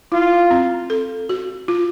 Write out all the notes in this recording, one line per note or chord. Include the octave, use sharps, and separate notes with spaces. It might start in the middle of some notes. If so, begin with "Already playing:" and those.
E4 F4
C4
A4
F#4
F4